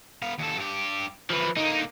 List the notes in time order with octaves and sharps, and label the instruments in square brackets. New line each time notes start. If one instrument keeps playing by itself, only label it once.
[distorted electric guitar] B3 F5
D#2 A4
G2 G4
[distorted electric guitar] E3 [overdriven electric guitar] F3 B4
[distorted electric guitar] D3 A#3 [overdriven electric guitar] D#4